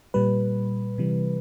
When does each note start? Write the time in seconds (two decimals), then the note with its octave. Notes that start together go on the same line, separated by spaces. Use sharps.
0.14 A#2 G3 B4
0.98 C3 E3 G3